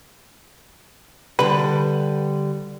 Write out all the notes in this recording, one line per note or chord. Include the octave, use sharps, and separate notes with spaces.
D3 G3 B4